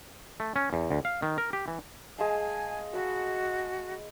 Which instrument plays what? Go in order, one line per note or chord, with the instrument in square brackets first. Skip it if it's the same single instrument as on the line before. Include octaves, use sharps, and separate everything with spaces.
[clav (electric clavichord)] A3
C#4
E2
D2
F5
D#3
A#4
G4
E3
[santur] G#3 F5 A5 [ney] G#5
[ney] F#4 [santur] B5 E6